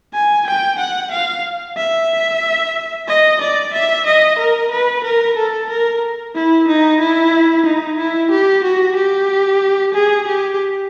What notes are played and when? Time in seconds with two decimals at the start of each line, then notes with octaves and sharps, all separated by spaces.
0.14 G#5
0.46 G5
0.79 F#5
1.11 F5
1.77 E5
3.08 D#5
3.41 D5
3.73 E5
4.06 D#5
4.39 A#4
4.71 B4
5.04 A#4
5.37 A4
5.69 A#4
6.35 E4
6.68 D#4
7.00 E4
7.66 D#4
7.98 E4
8.31 G4
8.64 F#4
8.96 G4
9.94 G#4
10.27 G4